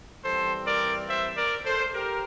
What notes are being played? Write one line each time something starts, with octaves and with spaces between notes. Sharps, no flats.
E3 G3 C4 A4 C5
A#4 D5
C5 E5
A#4 D5
A4 C5
G4 A#4